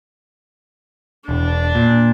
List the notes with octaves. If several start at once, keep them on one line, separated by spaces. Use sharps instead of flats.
E1 D4
A#2